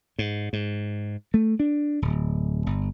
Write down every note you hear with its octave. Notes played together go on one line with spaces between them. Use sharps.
G#2
G#2
A3
D4
D1
G1